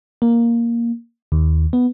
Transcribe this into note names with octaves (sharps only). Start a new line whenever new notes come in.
A#3
D#2
B3